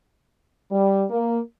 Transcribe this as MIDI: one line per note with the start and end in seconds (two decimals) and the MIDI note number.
0.71 1.04 55
1.10 1.39 58